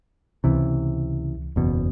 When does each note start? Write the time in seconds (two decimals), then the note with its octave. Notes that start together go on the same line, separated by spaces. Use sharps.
0.44 C#2 C3 E3
1.56 F#1 E2 B2